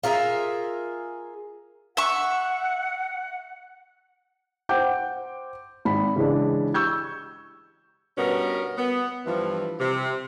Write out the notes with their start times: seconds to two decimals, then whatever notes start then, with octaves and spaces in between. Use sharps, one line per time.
0.04 F4 G#4 A#4 E5
1.97 E5 F#5 C#6
4.69 C5 F#5 G5 D6 G6
5.85 G#1 B5
6.16 C#3 E3 G#3 D4
6.74 C#6 E6 G6 G#6
8.18 G2 B2 B3 C#4 A#4
8.78 B3
9.27 G2 E3 F3
9.80 C3